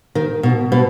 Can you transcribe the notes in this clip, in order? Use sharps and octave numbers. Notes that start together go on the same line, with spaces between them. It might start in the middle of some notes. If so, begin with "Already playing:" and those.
D#3
B2
B2